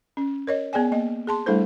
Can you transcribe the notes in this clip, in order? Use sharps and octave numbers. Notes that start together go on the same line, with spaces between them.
C#4
A#4 C#5 D#5
B3 G#4 D5 G5 G#5
A#3 D#5
G#4 A5 C6
G3 A3 D4 E4 A4 C5